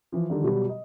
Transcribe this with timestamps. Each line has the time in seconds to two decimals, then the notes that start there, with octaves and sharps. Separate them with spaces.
0.12 E3 F3
0.30 D3 D#3 G3
0.44 B2 F#3 G3
0.69 D#5